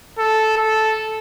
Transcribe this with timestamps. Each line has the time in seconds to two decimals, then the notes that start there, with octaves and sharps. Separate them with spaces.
0.19 A4
0.57 A4